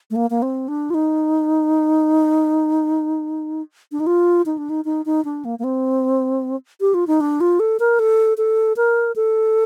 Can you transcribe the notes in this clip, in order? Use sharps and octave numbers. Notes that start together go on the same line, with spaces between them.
A3
A#3
A#3
C4
D4
F4
D#4
D4
D#4
F4
D#4
D4
D#4
D#4
D#4
D4
A#3
A#3
C4
G4
F4
D#4
D4
F4
A4
A#4
A4
A4
A#4
A4